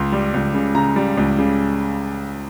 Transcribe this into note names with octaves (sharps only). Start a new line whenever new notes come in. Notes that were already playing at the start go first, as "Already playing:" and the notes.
Already playing: C#2 C6
G3
C#2
C#3
C#3 A#5
G3
C#2
C#3